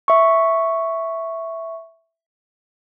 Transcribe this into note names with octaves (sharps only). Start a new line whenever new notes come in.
E5 C#6